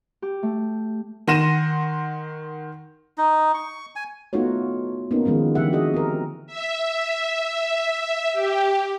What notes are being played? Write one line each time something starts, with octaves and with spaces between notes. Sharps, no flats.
G4
A3
D#3 F#5 C6 A#6 D#7 E7
D#4
C#6
G#5
A3 B3 D#4 F4 F#4 C#5
A#3 B3 C#4 D#4
D#3 F3 G#3 B3 C#4
D3 E3 F3 G4 E5 F#5
F#4 G#4 D#5
C4 A#4
E5
G4